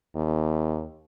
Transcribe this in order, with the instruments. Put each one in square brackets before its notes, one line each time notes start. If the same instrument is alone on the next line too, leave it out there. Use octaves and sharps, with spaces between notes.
[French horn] D#2